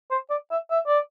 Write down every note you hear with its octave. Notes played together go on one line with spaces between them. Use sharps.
C5
D5
E5
E5
D5